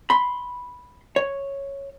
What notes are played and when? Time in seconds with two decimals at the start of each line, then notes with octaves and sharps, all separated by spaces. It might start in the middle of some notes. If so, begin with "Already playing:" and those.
0.10 B5 C6
1.16 C#5